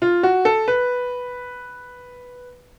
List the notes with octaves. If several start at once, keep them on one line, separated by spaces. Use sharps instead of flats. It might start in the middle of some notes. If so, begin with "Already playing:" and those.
F4
F#4
A4
B4